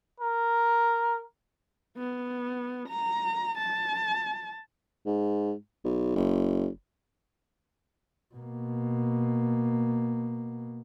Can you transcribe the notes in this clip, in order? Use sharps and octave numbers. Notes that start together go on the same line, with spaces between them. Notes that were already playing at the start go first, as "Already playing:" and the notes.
A#4
B3
A#5
A5
G#2
B1
F#1
B2 A#3